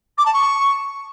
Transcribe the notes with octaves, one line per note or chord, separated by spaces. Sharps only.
D6
A5
C#6